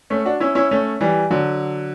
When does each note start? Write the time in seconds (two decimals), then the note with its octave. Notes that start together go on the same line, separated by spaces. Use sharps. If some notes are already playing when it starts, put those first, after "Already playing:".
0.10 A3 C#4
0.26 D4 F#4
0.40 C#4 E4
0.55 C#4 E4
0.71 A3 C#4
1.01 E3 G3
1.30 D3 F#3